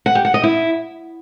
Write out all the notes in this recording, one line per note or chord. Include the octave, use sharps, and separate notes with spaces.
F#5
G4
F#5
D#5
E4